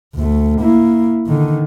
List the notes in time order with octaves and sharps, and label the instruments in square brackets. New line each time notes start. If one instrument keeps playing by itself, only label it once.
[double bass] D2 A3
A#3 E4
D3 D#3